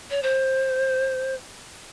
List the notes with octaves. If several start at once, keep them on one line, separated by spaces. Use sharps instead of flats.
C#5
C5